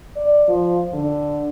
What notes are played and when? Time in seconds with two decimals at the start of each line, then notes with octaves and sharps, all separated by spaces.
0.16 D5
0.48 F3
0.94 D3